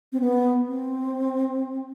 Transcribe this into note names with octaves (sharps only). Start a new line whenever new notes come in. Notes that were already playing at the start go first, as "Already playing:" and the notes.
C4
B3
C4